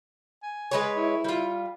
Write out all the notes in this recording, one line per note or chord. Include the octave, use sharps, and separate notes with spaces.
G#5
G#3 B4 C#5
E4
G3 F4